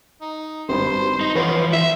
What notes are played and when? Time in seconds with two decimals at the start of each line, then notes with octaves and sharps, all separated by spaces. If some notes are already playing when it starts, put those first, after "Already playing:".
0.21 D#4
0.69 G#1 G2 C5 B5
1.21 D#4 D#5
1.35 E3 F3 B3 B4 C#5 C6
1.73 E4 E5